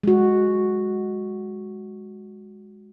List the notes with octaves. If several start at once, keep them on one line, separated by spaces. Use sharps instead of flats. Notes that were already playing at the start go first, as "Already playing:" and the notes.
G#3 F#4